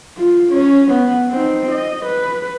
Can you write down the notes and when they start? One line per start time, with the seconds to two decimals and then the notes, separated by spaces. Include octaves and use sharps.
0.18 F4
0.51 C#4 C#5
0.91 B3
1.31 C4 D#4
1.71 D#5
2.05 B4